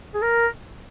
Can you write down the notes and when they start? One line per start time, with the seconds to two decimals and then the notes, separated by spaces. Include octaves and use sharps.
0.14 G#4
0.22 A#4